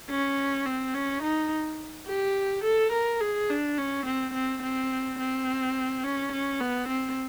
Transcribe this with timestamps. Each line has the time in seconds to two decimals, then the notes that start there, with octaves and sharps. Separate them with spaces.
0.10 C#4
0.66 C4
0.94 C#4
1.23 D#4
2.07 G4
2.64 A4
2.92 A#4
3.21 G#4
3.50 D4
3.78 C#4
4.06 C4
4.34 C4
4.63 C4
5.19 C4
6.04 C#4
6.32 C#4
6.60 B3
6.88 C4